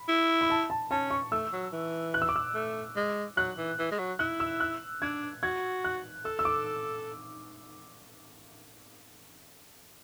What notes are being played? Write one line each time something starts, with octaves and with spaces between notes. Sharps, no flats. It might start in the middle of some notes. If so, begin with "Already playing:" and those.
Already playing: B5
E4
B5
A5
A5
C#4 A5
C#6
A3 E6
F#3
E3
F#6
E6
D6
E6
A3
G#3
F#3 F#6
E3
E3
G#3
F#3
E4 F#6
E6
F#6
D4 G#6
F#4 G#6
F#6
A4 E6
E6
D6